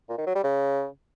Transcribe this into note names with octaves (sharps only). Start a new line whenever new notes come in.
A#2
D#3
F#3
G3
C#3